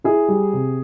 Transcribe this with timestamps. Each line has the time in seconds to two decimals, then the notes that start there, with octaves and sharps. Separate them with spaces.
0.04 E4 G#4
0.28 G3
0.53 C3